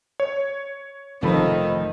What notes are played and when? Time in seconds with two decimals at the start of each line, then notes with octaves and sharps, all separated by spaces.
0.20 C#5
1.22 F1 D#3 F3 A4 B5